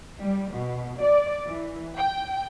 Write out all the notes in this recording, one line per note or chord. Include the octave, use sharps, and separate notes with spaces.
G3
B2
D5
E3
G5